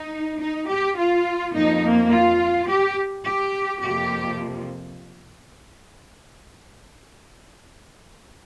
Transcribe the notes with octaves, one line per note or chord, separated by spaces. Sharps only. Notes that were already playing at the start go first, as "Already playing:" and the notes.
Already playing: D#4
D#4
G4
F4
F2 F3 A#3 D#4
A#3
F4
G4
G4
F2 C3 F3 A#3 G4